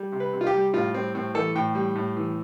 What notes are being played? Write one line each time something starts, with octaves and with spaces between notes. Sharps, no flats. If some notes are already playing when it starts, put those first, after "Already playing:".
Already playing: G3
C3
B4
C3
F4
G4
G3
A2 F4
G3 C4
A2 C4
E3 A4
A2 G5
G3
A2
E3